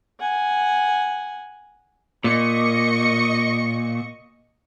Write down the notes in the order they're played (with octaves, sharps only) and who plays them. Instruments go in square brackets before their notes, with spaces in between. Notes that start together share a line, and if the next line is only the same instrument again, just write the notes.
[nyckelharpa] F#5 G#5
[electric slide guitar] A#2 [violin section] D#5 C#6 C#7